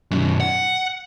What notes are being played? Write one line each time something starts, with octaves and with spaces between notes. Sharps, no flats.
B1 F#2
F#5